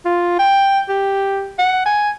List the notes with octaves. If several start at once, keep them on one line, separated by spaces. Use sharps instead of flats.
F4
G5
G4
F#5
G#5